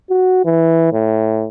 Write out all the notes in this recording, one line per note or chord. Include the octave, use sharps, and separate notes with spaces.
F#4
E3
A2